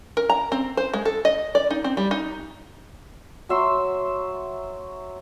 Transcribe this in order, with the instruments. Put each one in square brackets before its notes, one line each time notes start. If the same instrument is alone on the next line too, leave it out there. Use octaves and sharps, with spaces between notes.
[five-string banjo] A#4
A#5
C4
C5
G#3
A4
D#5
D5
D#4
C4
G3
D#4
[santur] F#3 E5 C6 C#6